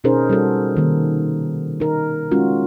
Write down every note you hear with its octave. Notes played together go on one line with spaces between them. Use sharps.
B2 C#4 D#4 G#4 A#4 C5
G3 F#4 A4
C3 D#3 A#3
D#4 A#4
G#3 C#4 F4 F#4